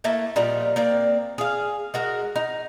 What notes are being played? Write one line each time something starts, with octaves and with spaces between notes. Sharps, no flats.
A3 A#3 E4 A5
A#2 F3 G3 D#4
A#3 C4 D5
G#4 F5
G#3 F#4 A#4
D#4